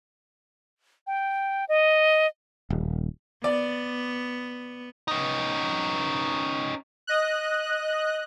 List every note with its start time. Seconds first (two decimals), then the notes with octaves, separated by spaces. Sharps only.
1.07 G5
1.69 D#5
2.70 D#1
3.44 B3 D5
5.08 C#4 D#4
7.07 D#5 F#6